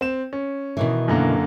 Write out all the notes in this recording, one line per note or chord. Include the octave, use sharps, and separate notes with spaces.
C4 E7
C#4
B2 D#3 E3
F#2 D3 A#3